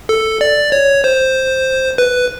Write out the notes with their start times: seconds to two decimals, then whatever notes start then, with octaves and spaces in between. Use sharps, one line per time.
0.09 A4
0.41 D5
0.72 C#5
1.04 C5
1.98 B4